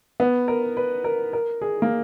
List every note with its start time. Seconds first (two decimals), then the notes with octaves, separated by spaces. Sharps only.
0.20 B3
0.48 A#4
0.77 B4
1.04 A#4
1.33 A#4
1.62 G#4
1.82 A#3